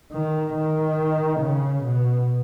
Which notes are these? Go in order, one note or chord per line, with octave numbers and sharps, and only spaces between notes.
D#3
D#3
C#3
B2